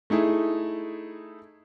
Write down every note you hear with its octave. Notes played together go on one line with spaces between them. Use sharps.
A3 D#4 E4 G#4